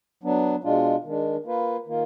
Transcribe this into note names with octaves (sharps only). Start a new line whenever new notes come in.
F#3 B3 D4
B2 G#3 D4 F4
D#3 G#3 D4
A#3 F4 B4
D#3 A#3 F4